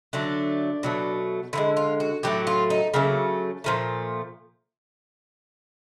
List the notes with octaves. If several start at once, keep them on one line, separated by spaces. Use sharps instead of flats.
D3 F#3 A3 D4
B2 F#3 A3
D3 F3 G#3 E4
F4
F#4
A2 F#3 A3 G4
F4
D#4
C#3 F#3 A3 A#3
A#2 F3 A3